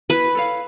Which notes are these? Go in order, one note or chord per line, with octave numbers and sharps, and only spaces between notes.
E4 B4
A4 C#5 F5